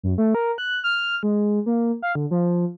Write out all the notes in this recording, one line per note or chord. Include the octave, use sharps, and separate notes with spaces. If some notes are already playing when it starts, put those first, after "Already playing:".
F#2
A3
A#4
F#6
F6
G#3
A#3
F5
D3
F3